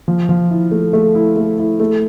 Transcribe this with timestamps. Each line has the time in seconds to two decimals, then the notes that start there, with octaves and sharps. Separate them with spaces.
0.08 F3
0.29 F3
0.51 E4
0.71 A3
0.93 A3
1.15 E4
1.36 A3
1.59 E4
1.80 A3